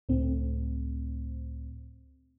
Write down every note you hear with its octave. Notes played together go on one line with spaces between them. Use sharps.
C#2 A2 A3 C4